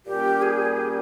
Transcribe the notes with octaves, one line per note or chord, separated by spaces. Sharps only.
A#2 G3 A#3 C#4 G4
G#4
G4